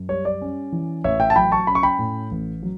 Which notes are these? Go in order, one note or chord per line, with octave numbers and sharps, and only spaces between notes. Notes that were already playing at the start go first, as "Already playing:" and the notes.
Already playing: F#2
G3 C#5
D5
C#4
E3
A1 C#5 E5
E5 G5
A5
F#3 G5 B5
A5 C#6
C#4 B5
C#6
G5 B5
A2
A1
F#3